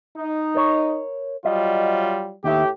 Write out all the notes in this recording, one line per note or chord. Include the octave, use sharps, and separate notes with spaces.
D#4
A#4 C#5
F#3 G3 F4 D#5
D#2 A2 D#4 G4 E5